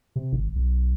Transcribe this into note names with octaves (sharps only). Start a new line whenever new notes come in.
C3
G#1
B1